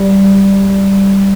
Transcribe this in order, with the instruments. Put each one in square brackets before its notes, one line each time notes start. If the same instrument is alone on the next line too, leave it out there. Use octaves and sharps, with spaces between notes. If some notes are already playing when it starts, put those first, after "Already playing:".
Already playing: [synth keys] G3